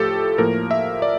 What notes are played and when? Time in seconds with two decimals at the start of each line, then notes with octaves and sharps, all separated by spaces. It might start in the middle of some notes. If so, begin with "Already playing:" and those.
Already playing: A2 F3 A3 G4 A4
0.38 A2 F3 A#3 A#4
0.71 E5
1.02 D5